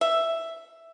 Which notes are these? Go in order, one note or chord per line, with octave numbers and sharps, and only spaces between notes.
E5